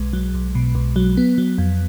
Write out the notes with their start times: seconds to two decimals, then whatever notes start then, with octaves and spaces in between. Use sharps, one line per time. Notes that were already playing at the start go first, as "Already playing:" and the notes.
Already playing: B1 G#3
0.13 F#3
0.34 B1
0.55 B2
0.75 B1
0.96 F#3
1.17 B3
1.38 F#3
1.58 F2